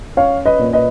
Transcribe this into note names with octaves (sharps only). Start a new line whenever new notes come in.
C#4 C#5 F5
B4 D#5
A#2
B4 D#5